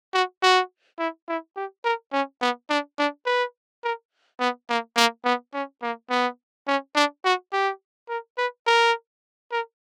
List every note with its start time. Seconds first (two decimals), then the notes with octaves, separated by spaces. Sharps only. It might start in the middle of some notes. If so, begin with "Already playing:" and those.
0.14 F#4
0.43 F#4
0.99 E4
1.29 E4
1.56 G4
1.85 A#4
2.13 C#4
2.41 B3
2.70 D4
2.98 D4
3.26 B4
3.84 A#4
4.40 B3
4.69 A#3
4.97 A#3
5.25 B3
5.54 C#4
5.82 A#3
6.10 B3
6.68 C#4
6.96 D4
7.25 F#4
7.53 G4
8.09 A#4
8.38 B4
8.67 A#4
9.52 A#4